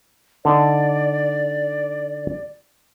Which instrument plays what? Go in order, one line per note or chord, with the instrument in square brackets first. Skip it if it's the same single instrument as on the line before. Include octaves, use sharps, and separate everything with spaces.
[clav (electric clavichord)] D3 D#4 [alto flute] D5